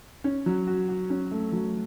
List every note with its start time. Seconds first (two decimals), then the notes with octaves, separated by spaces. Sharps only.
0.24 C#4
0.46 F#3
0.67 F#4
0.88 F#4
1.10 C#4
1.31 A3
1.53 F#3